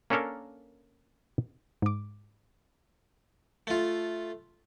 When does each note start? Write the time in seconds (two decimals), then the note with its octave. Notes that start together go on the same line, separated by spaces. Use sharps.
0.10 A#3 C#4 D4 A4 A#4 F5
1.82 G#2 D6
3.67 A3 F4